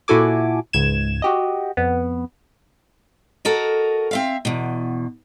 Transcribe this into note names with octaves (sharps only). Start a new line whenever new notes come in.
A#2 E4 F#4 A4 G#5 D6
C#2 G#2 G#6 E7
F#4 G4 D#5
F2 B3
F#4 A4 A#4 D#5
C4 E5 F5
E2 B2